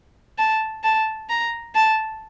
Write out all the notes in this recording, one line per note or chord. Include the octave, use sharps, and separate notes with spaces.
A5
A5
A#5
A5